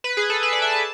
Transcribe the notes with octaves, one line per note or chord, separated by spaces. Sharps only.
B4
G#4
A4
B4
D5
E5
A5